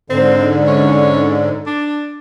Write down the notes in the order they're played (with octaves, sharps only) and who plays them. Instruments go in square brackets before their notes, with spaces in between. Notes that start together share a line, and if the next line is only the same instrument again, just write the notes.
[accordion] G#2 D3 [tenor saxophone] C4
[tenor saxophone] C#4
D4